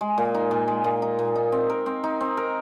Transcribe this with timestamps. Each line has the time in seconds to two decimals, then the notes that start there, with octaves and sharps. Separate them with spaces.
0.01 G#3
0.18 A#2
0.34 D#4
0.51 A#2
0.68 G#3
0.84 A#2
1.02 D#4
1.19 A#2
1.35 D#4
1.52 C4
1.70 A#4
1.86 C4
2.04 D#4
2.21 C4
2.37 A#4